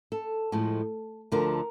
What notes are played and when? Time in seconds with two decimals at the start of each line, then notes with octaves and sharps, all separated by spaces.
0.12 A4
0.52 A2 F3 G#3
1.32 D2 D3 F3 A#4